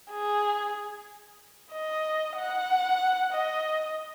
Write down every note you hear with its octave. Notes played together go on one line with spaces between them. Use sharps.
G#4
D#5
F#5
D#5